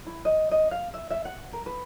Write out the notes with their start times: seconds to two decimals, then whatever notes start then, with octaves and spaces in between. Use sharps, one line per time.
0.06 E4
0.25 D#5
0.51 D#5
0.71 F5
0.94 E5
1.10 E5
1.25 F#5
1.53 A#4
1.66 B4